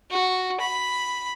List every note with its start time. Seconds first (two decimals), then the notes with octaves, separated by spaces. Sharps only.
0.11 F#4
0.61 B5